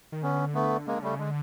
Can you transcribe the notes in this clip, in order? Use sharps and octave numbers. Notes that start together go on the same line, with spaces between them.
D#3
D3 B3 C#4
A3 B3
C#3 G#3 A#3
D3
C#3 G3 A3
D3 G#3